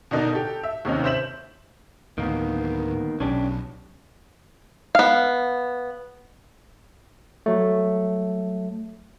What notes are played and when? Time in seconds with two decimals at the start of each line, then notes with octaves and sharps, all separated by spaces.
0.11 B2 D3 D4 D#4 A#4
0.33 G4 A4
0.63 E5
0.85 D#2 C3 C#4 D#4
1.04 C5 E5 G6 B6 E7 F#7
2.18 D2 A2 D#3 A#3 B3
3.20 B1 C#4 D4 G4
4.95 B3 F5
7.46 F#3 A3